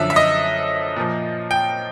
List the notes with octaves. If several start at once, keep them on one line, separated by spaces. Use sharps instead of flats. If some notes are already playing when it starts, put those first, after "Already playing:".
Already playing: F#2 D3 F3 E5
E5
D#5
A#2 F3
G5